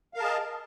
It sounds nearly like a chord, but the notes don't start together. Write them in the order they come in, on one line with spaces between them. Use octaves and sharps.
F5 A#4 A5 G#4 D#5